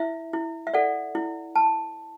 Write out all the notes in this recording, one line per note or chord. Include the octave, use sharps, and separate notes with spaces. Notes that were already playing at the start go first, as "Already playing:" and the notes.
Already playing: E4 E5
E4
E5
A4 D5 F#5
E4
A5